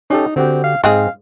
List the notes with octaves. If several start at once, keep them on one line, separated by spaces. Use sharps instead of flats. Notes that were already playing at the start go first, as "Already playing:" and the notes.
C#4 D#4 G4 A4
D3 C4 F#4 G4
F5
G#2 G#3 C4 G#4 F5